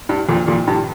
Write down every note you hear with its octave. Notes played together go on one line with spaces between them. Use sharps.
G2
F2 A#2
F2 A#2
G2